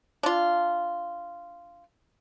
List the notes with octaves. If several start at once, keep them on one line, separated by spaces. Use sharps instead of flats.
D4 F4